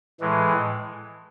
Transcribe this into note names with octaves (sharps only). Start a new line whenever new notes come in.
A2 E3 G#3